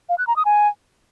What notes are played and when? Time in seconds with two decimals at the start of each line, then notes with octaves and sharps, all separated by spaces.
0.09 F5
0.18 F#6
0.27 A#5
0.36 D#6
0.45 G#5